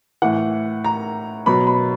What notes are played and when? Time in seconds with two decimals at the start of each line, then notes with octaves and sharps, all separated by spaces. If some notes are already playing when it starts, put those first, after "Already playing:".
0.22 A2 E3 F#5
0.84 A#5
1.46 B2 F#3 B5
1.67 B5